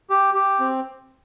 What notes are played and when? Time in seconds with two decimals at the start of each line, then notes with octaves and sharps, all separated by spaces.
0.10 G4
0.34 G4
0.60 C4